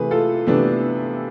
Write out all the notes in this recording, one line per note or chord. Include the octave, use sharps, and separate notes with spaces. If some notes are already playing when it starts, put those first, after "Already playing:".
Already playing: C3 E3 A3 G#4 B4
F4 A4
C3 E3 A3 B3 D4